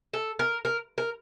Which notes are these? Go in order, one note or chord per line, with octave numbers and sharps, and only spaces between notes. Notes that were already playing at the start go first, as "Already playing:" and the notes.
A4
A#4
A#4
A#4